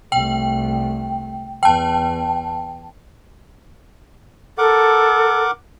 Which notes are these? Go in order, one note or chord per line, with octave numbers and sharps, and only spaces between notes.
C2 A3 G5
E2 G5 A5
A4 A#4 F#5 D6